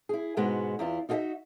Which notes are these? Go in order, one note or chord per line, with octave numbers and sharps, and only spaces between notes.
E4 G#4
G#2 B2 G#3 B3 F#4
E2 E4 F4
D#4 F4 F#4 G#4 D#5 E5